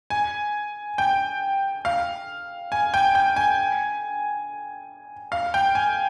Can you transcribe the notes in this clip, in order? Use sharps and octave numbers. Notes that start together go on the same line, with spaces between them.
G#5
G5
F5
G#5
G5
G5
G#5
F5
G5
G#5